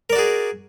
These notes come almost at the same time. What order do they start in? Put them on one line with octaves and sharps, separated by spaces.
A#4 D5 F#4 G#4